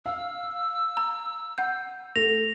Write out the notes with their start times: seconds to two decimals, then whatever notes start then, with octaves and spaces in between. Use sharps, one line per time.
0.06 F5 E6
0.97 A#5
1.58 F#5 G6
2.16 A3 A#6 F7